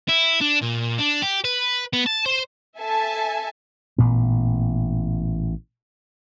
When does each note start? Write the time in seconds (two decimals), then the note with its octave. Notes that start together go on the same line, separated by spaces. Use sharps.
0.08 E4
0.41 D4
0.62 A#2
0.98 D4
1.22 G4
1.44 B4
1.93 B3
2.06 A5
2.26 C5
2.80 A4 E5 G#5 A5
3.98 A1 A#2 B3